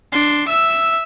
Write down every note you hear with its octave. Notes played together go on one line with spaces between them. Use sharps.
D4 C6
E5 E6